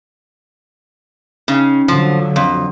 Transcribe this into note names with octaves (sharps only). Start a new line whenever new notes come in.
C#3 C#4 D#4
D3 F3 F#3 F5
F2